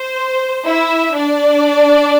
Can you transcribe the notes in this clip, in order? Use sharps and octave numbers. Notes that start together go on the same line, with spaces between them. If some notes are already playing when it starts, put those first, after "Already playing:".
Already playing: C5
E4 E5
D4 D5